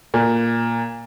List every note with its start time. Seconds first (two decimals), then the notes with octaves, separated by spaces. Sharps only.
0.14 A#2